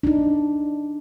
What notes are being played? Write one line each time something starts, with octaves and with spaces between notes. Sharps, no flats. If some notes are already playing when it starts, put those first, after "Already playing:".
D4 D#4